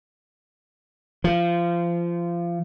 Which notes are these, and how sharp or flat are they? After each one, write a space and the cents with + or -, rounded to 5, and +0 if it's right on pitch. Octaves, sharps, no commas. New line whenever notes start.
F3 -25